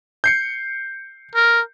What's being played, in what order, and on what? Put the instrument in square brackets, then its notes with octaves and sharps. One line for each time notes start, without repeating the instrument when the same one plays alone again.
[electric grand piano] G6 C7 C#7
[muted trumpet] A#4